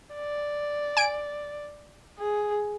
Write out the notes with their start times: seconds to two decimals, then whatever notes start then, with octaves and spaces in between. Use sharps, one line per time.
0.15 D5
0.97 G#5 D7
2.19 G#4